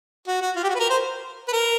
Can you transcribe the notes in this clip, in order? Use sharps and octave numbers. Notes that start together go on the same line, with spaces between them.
F#4
F#4
F4
G4
F#4
B4
A#4
C5
B4
A#4